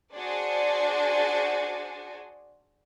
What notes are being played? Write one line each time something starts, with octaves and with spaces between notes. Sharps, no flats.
D4 F#4 G#4 C5 D5 G#5